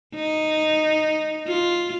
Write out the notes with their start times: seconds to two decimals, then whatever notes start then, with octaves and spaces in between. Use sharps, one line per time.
0.15 D#4
1.47 F4